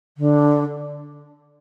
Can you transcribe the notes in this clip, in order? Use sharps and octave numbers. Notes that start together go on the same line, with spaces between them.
D3